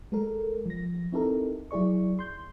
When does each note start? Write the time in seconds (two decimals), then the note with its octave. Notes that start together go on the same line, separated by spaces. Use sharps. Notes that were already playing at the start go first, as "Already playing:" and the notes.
0.12 G#3 A4 A#4
0.66 F3 A#6
1.12 C4 D#4 E4 G4 A4 A#4
1.71 F#3 E4 G#4 D5 C#6
2.19 C6 G6